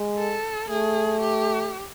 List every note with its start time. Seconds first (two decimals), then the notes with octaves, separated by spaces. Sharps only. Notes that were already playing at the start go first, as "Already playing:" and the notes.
Already playing: G#3
0.17 A4
0.68 A3 G#4
1.20 G4